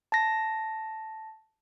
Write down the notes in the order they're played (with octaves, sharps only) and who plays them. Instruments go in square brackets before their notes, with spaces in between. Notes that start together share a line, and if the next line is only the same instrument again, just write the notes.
[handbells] A5 A#6